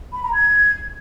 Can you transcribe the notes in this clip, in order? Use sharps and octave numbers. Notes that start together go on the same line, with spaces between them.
B5
A#5
G#6